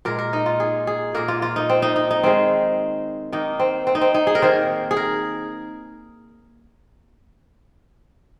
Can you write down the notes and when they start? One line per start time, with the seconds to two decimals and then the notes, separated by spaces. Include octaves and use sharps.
0.05 A#2 G#3 A#4
0.19 A#4
0.33 D#4
0.46 F4
0.60 G#4
0.87 G#4
1.14 A#2 A#3 A#4
1.28 F4
1.42 F4
1.56 D#4
1.69 C4
1.82 D#4
1.96 D#4
2.11 D#4
2.23 D#3 G#3 C4
3.32 D#3 A#3 D#4
3.59 C4
3.87 C4
3.95 D#4
4.01 C4
4.14 D#4
4.27 G#4
4.35 A#4
4.42 D#3 A#3 C5
4.91 G#4
4.97 A#4